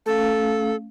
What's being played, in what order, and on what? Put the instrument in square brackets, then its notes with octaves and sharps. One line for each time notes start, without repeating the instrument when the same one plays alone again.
[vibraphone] A3 C#4 F5 [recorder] A4